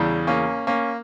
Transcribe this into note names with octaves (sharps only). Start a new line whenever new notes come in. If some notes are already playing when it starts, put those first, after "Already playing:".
Already playing: E2 C#3 E3 G3
A#3 C#4
A#3 C#4